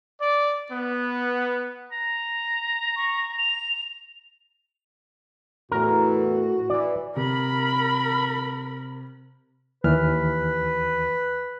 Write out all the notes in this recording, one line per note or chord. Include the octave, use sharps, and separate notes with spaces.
D5
B3
A#5
C#6
F7
E2 A2 E3 F#4 A#4
E3 D5
C3 A#4 B5
D#2 E3 B4 F6